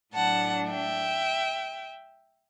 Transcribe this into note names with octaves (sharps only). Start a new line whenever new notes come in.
A2 F#3 A3 D4 F#5 A5
E5 G5